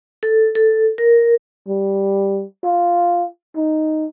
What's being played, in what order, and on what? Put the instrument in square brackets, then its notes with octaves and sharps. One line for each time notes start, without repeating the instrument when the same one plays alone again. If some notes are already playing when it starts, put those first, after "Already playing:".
[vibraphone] A4
A4
A#4
[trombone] G3
F4
D#4